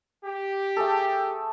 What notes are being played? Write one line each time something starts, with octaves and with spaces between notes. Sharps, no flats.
G4
A3 G#4 A4